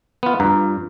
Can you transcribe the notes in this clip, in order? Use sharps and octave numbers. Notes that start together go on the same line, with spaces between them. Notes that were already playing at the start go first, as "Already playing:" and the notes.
B3 F4
G2 F4 A#5